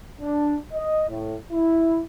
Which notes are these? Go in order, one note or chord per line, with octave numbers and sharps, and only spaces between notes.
D4
D#5
A2
E4